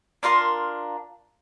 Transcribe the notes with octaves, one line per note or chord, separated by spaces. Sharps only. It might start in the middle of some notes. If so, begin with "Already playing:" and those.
D4 F4 A#4 C6